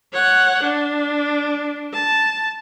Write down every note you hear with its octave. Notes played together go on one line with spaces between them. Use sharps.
C#5 F#5
D4
A5